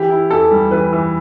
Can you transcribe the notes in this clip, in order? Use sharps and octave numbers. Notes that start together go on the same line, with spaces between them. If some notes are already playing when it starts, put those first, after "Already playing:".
Already playing: E3 G4
E4
E2 A4
G3
E3 B4
E3